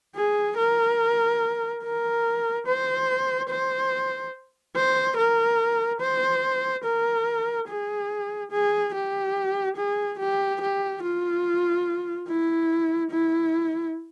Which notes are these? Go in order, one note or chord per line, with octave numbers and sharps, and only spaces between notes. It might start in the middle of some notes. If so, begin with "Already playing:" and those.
G#4
A#4
A#4
C5
C5
C5
A#4
C5
A#4
G#4
G#4
G4
G#4
G4
G4
F4
E4
E4